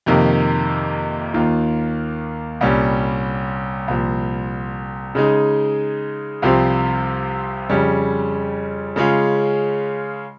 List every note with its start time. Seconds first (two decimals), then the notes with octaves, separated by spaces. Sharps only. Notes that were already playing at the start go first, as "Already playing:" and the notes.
0.06 F2 C3 D#3 A#3
1.34 D#2 D#3 A#3 F4
2.61 C2 A#2 G3 C#4
3.88 C2 A#2 F3
5.15 C#3 G#3 D#4
6.42 C2 C3 F3 C4 F4
7.69 F2 C#3 G3 C#4
8.96 C#3 G#3 C#4 F4